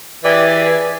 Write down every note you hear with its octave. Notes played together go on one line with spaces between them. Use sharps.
E3 G4 G#4 D5